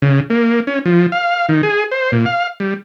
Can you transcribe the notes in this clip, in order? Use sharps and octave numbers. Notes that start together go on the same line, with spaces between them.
C#3
A#3
C#4
F3
F5
D#3
G#4
C5
A#2
F5
G3